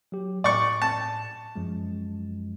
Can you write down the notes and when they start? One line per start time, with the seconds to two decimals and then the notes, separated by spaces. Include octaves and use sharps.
0.12 F#3 G4
0.44 A2 D5 C#6
0.82 A5
1.56 F#2 F3 G#3